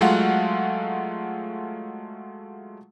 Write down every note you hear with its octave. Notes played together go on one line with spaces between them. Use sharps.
F#3 G#3 A3 F4 F5 F#5